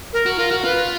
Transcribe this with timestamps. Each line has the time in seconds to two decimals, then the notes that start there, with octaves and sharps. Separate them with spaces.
0.13 A#4
0.26 F#4
0.38 F4 A#4
0.51 F#4
0.64 F4 B4